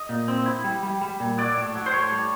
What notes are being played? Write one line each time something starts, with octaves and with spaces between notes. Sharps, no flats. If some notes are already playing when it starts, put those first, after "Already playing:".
Already playing: D#5
A#2
C4
E4
G3
G3
G3
A#2
F#3 D5
A2
F#3
C5
A2 C#5
G3